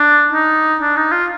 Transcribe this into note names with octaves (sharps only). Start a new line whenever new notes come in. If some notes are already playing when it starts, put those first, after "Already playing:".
Already playing: D4
D#4
D4
D#4
F4